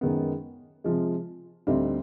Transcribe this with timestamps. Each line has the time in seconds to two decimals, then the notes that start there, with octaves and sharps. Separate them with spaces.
0.01 F#2 D#3 G#3 B3
0.84 C3 F3 G#3
1.67 D2 D3 G3 C4 D#4